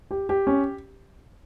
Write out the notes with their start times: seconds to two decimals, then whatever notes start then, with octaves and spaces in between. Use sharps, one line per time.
0.11 G4
0.29 G4
0.47 C#4